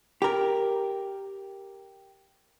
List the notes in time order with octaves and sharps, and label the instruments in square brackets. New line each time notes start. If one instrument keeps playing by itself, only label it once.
[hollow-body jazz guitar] G4 A#4